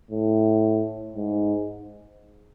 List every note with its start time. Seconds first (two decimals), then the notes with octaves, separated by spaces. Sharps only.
0.11 A2
1.16 G#2